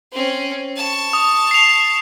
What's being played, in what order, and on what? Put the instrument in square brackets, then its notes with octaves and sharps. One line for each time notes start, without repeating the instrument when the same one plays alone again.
[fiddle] C4 C#4
A5 C#6
[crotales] D#6
C7 F7